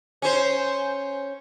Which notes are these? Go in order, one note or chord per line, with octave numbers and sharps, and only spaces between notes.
C#4 C5